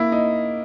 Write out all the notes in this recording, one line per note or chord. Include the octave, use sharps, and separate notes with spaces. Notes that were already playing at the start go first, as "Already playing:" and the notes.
Already playing: A#3 E4
D#4